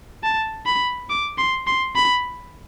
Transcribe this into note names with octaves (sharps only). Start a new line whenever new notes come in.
A5
B5
D6
C6
C6
B5